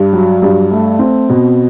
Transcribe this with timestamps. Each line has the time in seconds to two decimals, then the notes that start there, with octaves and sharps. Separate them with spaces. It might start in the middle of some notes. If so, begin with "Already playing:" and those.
Already playing: G2
0.13 F#3
0.42 G2
0.71 A3
0.99 C4
1.29 B2